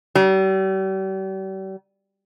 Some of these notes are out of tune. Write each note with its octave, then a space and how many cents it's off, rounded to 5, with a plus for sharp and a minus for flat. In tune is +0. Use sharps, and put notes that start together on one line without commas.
G3 -40